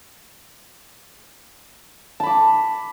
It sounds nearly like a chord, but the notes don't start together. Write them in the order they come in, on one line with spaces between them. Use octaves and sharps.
A5 B5 D6